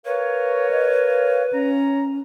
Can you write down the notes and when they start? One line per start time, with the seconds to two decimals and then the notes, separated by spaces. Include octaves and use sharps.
0.06 A#4 B4 C#5 F5
0.71 D#5
1.06 F5
1.53 C#4 C#5 A#5